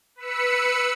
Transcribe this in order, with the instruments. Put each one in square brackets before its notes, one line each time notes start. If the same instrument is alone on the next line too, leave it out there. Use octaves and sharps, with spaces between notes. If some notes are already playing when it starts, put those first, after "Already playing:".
[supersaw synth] B4 B5 E6 C#7